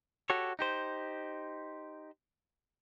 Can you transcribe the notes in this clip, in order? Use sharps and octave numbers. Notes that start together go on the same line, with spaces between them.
F#4 G4 A4 C#5
D#4 G4 C5